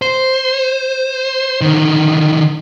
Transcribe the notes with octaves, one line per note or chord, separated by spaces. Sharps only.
C5
D3 D#3